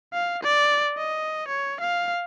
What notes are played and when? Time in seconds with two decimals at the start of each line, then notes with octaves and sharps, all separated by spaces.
0.13 F5
0.43 D5
0.98 D#5
1.48 C#5
1.80 F5